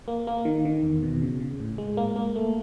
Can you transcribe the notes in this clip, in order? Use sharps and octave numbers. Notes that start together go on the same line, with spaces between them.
A#3
A#3
D#3
D#3
E2
B2
C#3
C#3
A2
G#3
A#3
A#3
A3